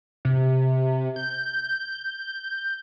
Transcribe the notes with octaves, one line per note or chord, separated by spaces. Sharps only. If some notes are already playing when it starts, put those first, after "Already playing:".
C3
G6